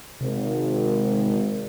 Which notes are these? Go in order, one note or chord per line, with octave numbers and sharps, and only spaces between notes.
G#1 C3